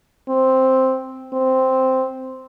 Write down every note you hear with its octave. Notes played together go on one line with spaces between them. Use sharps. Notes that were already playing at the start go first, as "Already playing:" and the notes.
C4
C4